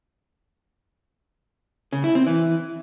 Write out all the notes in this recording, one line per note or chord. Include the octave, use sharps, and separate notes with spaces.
C#3
E4
C4
E3